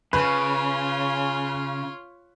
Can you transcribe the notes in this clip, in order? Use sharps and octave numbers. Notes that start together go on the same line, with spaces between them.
C#3 F4 B4 C#5